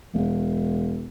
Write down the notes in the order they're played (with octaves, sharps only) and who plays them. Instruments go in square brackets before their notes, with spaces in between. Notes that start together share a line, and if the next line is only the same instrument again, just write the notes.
[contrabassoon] E1